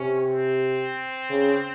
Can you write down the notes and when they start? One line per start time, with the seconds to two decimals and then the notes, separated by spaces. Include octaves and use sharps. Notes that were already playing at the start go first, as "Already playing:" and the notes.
Already playing: C3 C#4
0.25 C4
1.30 C#3